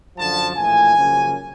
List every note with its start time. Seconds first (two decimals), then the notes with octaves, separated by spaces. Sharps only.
0.18 F#2 D3 F3 A5
0.56 A#1 A2 E3 A3 G#5
0.96 F#2 C#3 F3 A#3 C#4